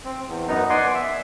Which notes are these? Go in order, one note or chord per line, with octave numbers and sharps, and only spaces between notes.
C4
E2
F#2 B3 D#4
D5 F#5 G#5 C6
E5